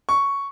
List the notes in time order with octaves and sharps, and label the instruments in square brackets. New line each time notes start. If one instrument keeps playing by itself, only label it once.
[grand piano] C#6